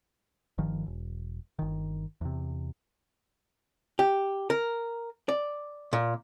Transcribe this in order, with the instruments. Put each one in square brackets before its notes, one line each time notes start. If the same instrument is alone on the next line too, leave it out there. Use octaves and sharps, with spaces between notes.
[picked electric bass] G1 D#3 F3
E1
G1 D#3
E2 C3
[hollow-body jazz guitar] G4
A#4
D5
A#2